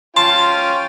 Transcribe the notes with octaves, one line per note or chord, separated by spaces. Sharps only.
C#4 F4 G5 A5 C6